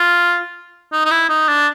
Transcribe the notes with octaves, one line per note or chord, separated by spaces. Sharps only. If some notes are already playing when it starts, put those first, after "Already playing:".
Already playing: F4
D#4
D#4
E4
D#4
D4